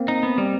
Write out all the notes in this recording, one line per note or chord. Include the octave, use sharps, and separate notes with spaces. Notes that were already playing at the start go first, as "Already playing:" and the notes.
Already playing: A#3 C4
D#4
B3
G3